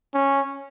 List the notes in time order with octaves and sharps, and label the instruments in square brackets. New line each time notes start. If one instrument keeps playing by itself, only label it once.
[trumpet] C#4